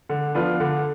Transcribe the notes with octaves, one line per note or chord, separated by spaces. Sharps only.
D3
F3 B3 D4 F4
D3